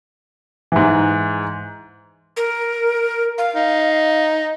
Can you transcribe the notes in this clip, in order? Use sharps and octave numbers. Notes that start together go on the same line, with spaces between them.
G#2 E3
A#4
F5
D#4